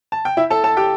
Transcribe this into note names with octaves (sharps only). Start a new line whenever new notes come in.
A5
G5
E4 E5
A4 A5
A4 A5
G4 G5